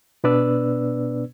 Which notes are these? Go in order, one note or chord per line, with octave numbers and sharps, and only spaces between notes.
B2 B3 D4 B4 D5 E6